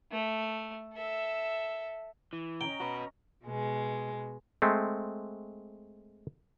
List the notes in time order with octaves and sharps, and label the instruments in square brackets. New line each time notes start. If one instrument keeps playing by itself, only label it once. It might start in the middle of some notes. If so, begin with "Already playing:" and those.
[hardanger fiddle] A3
A4 E5
[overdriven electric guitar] E3
[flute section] C#4 D#5 A#5 [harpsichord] G5
[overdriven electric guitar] F#4 B4
[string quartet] B2 G#3
[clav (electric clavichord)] G#3 A3 C4